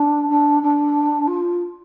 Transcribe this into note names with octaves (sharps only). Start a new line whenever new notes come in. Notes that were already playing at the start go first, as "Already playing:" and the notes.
Already playing: D4
D4
D4
F4